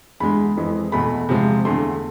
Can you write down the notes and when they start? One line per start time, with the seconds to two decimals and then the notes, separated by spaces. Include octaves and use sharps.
0.20 E2 D3 G#3 B5
0.57 F2 E3 G#3
0.92 E2 B2 A3 B5
1.28 E2 C3 F3 G#3
1.65 E2 D3 A3 C6